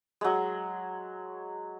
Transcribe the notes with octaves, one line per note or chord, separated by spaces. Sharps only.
F#3 G#3